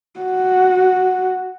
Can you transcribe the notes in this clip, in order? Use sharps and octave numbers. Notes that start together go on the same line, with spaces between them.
F#4